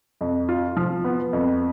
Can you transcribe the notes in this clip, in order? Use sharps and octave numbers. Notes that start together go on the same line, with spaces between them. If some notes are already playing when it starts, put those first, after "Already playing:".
F2
F4
F3
B3
F2